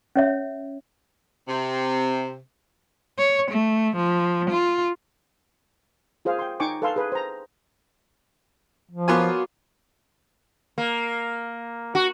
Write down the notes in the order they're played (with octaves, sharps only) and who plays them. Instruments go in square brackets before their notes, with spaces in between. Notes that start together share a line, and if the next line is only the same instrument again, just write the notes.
[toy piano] C#4 C#5 E5
[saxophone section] C3
[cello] C#5
A3
F3
F4
[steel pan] F4 G#4 C5 F5
G5 C6
D#4 G5 G#5 C#6 D6
A4 B4 F5 G#5 C6 E6
G#4 B4
C5 A#5
[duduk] F3
[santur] F#3 A#3 [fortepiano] B3 F4 G#5
[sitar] A#3
F#4